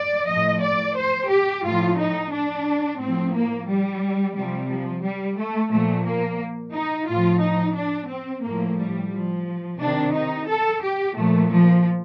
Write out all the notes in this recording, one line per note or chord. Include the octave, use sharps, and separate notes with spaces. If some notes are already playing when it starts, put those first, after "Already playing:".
Already playing: D5
A2 F3 D#5
D5
C5
G4
A2 F3 F4
D#4
D4
A2 F3 C4
A#3
G3
C3 F3 G3
F3
G3
A3
A#2 F3 A3
A#3
D#4
A2 F3 F4
D#4
D4
C4
A2 F3 A#3
G3
F3
C3 D#3 D4
D#4
A4
G4
A#2 F3 A3
F3